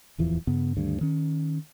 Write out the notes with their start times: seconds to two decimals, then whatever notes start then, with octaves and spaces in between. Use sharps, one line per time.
0.18 D1 E2 E3 F3
0.47 G2 C#3 B3
0.77 D2 G2 D#3
1.01 D#3 C#4